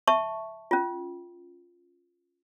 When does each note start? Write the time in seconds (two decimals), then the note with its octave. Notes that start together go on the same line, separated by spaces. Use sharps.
0.07 E5 A5 C#6
0.71 C#4 F4